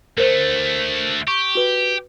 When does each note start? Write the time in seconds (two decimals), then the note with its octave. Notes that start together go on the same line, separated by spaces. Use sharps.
0.18 D2 A3 A#4 C5
1.28 G4 C#6
1.55 F#4 B4